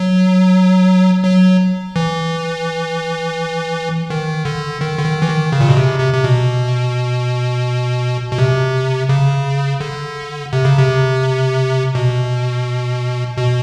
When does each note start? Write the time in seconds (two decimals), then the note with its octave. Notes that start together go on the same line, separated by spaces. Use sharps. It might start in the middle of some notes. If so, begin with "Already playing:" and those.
Already playing: F#3
1.25 F#3
1.96 E3
4.10 D#3
4.45 D3
4.81 D#3
4.98 D3
5.05 D#3
5.22 E3
5.29 D#3
5.52 C#3
5.61 A#2
5.69 B2
5.77 C3
6.00 C3
6.13 C3
6.24 B2
8.32 B2
8.39 C3
9.09 C#3
9.80 D3
10.53 C3
10.65 C#3
10.78 C3
11.95 B2
13.38 B2